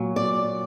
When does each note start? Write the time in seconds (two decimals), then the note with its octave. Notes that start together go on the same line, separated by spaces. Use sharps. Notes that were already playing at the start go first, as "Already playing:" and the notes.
Already playing: A#2 F#3
0.16 D5